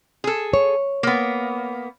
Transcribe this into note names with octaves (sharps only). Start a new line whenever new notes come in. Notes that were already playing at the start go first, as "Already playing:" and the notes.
G#4 A4
C#5
A#3 B3